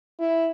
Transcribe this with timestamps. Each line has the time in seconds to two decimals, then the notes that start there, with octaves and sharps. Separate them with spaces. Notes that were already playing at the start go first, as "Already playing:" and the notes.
0.19 E4